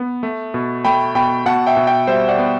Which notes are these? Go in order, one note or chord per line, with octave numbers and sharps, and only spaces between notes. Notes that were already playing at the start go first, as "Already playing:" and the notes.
Already playing: B3
A3
B2
A3 G5 B5
B2 G5 B5
B2 F#5 A5
E5 G5
B2
E5 G5
G3 C5 E5
D5 F#5
B3